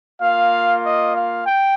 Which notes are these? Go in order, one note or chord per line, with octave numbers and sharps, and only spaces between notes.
A#3 F4 F5
D#5
F5
G5